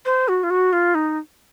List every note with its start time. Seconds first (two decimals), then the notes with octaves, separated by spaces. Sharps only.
0.05 C5
0.28 F#4
0.43 F4
0.50 F#4
0.73 F4
0.95 D#4